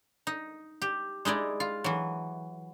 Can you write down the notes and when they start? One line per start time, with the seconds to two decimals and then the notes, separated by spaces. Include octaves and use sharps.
0.27 D#4
0.82 G4
1.25 G#3 D#4 E4 D5
1.60 F4
1.84 E3 F#3